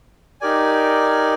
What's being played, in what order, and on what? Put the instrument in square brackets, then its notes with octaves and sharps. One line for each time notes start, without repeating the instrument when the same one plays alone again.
[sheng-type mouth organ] D#4 G4 A#4 D5 G#5